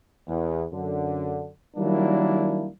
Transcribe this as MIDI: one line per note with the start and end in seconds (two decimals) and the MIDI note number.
0.28 0.64 40
0.71 1.48 42
0.71 1.48 50
1.77 2.67 51
1.77 2.67 54
1.77 2.67 55
1.77 2.67 58
1.77 2.67 62
1.77 2.67 64